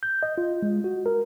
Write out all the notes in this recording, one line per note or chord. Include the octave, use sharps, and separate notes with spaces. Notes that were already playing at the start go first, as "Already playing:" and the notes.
G6
D#5
F4
G#3
F#4
A#4